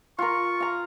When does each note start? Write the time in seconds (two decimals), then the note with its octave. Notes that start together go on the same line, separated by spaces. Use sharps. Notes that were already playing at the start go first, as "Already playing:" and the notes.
0.19 F4 A#4 C#6
0.60 F5 A#5